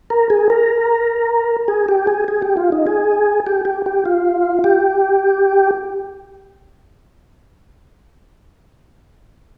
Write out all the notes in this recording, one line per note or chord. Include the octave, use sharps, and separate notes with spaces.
A#4
G#4
A#4
G#4
G4
G#4
G#4
G4
F4
D#4
G#4
G4
G4
G4
F4
G4